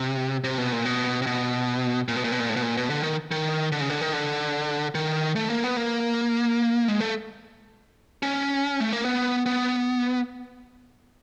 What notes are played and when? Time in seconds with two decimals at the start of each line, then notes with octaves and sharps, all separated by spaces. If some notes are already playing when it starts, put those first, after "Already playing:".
Already playing: C3
0.44 C3
0.58 B2
0.72 A#2
0.85 B2
1.22 C3
1.27 B2
2.08 A#2
2.16 B2
2.24 A#2
2.32 B2
2.40 A#2
2.49 A2
2.56 B2
2.62 A#2
2.77 B2
2.90 D3
3.03 D#3
3.31 D#3
3.72 D3
3.81 C#3
3.90 D3
4.01 D#3
4.13 D3
4.95 D#3
5.36 A3
5.50 A#3
5.64 B3
5.76 A#3
6.88 G#3
7.00 A3
8.23 C#4
8.80 A3
8.93 A#3
9.05 B3
9.46 B3